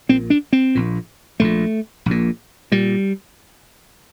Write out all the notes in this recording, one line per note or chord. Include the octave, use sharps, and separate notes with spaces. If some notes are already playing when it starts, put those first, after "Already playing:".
A#1 A#2 C4
D4
C4
A#1 A#2
A#1 A#2 A3
A#1 A#2
A#2 G3